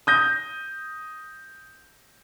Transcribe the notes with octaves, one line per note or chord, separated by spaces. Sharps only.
D#6 G6 A#6